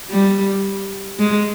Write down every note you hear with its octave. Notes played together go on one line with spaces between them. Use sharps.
G3
G#3